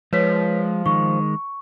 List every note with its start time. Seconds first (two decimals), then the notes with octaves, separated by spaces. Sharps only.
0.13 F3 G#3 B4 C#5 B6
0.86 D#3 G#3 C#6